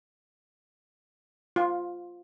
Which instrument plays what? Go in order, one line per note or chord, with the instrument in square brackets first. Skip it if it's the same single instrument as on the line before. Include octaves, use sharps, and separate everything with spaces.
[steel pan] F4